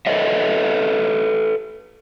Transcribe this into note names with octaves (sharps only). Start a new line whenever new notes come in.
A4 B4 C#5 D#5 E5